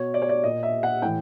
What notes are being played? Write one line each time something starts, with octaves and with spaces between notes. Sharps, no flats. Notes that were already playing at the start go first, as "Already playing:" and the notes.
Already playing: B2 C#5
D5
C#5
D5
A#2 D#5
E5
F#5
A2 E3 G5